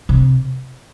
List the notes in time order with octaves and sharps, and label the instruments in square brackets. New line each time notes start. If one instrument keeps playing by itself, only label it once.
[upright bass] C3